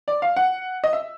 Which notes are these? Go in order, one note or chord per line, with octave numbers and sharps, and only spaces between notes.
D5
F5
F#5
D#5
E5